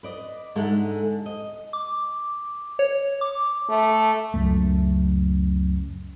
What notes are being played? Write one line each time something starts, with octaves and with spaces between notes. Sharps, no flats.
B4 D5 D#5
G#2 D3 G#3 A4 E5 F#5
D#5
D6
C#5
D6
A3
C#2 F#2 A3